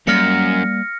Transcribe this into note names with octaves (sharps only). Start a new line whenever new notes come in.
F#2 G3 A#3 F6 A#6 C#7